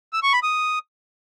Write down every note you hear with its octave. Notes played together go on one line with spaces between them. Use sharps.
E6
C#6
B5
D#6